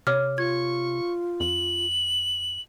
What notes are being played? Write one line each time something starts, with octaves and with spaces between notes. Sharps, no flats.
C3 C#5 D6 F6
F4 C#6 G#6
F2 F#7